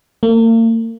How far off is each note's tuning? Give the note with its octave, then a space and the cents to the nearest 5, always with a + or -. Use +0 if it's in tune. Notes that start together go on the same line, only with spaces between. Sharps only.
A#3 -45